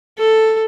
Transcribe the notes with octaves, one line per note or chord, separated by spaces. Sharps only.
A4